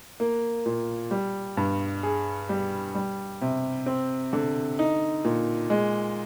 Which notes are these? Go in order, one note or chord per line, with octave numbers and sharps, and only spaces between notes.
A#3
A#2
G3
G2
G#4
G3
G3
C3
C4
D3
D#4
A#2
G#3